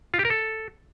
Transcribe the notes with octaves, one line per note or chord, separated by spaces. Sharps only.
F4
G4
A#4
A4